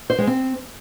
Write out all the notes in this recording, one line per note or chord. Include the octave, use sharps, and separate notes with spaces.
C5
G#3
C4